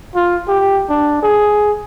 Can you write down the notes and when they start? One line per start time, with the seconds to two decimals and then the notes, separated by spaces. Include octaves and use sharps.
0.16 F4
0.48 G4
0.89 D4
1.23 G#4